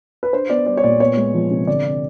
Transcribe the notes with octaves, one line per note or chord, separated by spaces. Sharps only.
B4
D4 C5
B3 D5
G3 D5
C#5
A#2 D5
B3 C#5
G#3
F3
C3
D3 D5
C4